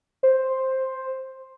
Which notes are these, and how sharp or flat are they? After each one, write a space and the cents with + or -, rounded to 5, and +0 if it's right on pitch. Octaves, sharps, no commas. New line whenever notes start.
C5 +5